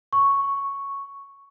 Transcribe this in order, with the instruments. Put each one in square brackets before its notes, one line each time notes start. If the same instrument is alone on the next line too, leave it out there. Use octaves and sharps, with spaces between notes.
[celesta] C#6